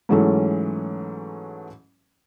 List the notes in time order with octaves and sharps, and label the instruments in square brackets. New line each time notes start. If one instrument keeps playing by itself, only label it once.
[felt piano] G#2 E3 F#3 G#3 A3 C#4